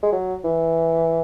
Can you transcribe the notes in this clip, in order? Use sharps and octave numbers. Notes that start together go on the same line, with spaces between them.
G#3
F#3
E3